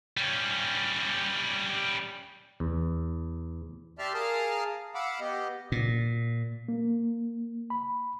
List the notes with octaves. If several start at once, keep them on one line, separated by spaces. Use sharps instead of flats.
G3 C#4
E2
G4 D5 E5 A5 C6 F6
G#4 A#4 F5 A5 D#6 F6
F5 F#5 B5 D6 E6
B3 G4 D#5
A#2
A#3
B5